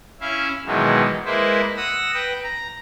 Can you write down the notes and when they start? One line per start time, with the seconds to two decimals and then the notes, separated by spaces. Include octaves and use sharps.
0.21 C#4 E4 E5 F5
0.66 B2 D#3 E3 F#3 G#3
1.25 G#3 A#3 E4 B4 C5
1.77 F#5 D#6 E6 A#6
2.14 B4 G5
2.43 A#5